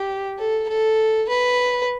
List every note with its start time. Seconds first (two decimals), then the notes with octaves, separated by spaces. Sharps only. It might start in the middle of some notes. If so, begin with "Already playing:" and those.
Already playing: G4
0.39 A4
0.69 A4
1.29 B4